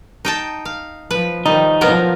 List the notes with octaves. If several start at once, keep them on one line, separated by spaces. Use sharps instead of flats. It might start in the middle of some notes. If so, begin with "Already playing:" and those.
D#4 G5 A5
F5
F3 B4
D#3 F3 G3 D#4
F3 F#3 B3 A#4